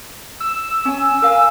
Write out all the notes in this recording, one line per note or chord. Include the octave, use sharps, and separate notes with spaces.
E6
C#4 G#5
A#4 F5 G#5